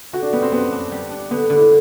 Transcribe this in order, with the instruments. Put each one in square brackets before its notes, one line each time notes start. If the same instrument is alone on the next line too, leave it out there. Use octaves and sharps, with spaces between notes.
[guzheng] D3 [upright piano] F#4
[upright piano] D4
[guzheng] G3 [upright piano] B3
[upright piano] C4
[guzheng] F#2 [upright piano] B3
[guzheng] D4
G3
D4
[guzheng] D3 [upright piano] B3
[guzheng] D3
[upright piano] E4